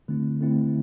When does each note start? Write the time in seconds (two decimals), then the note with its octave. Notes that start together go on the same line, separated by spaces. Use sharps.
0.08 D3 A3 C4 E4
0.40 D3 A3 C4 E4